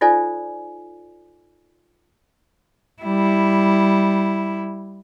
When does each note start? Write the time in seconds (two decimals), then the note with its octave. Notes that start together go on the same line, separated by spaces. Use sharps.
0.01 D#4 F4 A4 C5 D5 G#5
3.03 G3 E4